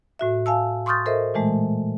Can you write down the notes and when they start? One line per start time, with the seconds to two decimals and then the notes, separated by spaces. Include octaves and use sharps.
0.19 A2 F#4 E5
0.46 F5 G#5 A5 E6
0.86 C6 C#6 D#6 F6 G6 A6
1.06 A4 A#4 C5 D#5 E5
1.34 A#2 E3 G#3 A3